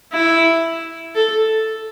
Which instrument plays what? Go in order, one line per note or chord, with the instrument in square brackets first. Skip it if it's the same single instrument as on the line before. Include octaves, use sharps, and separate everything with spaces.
[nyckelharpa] E4
A4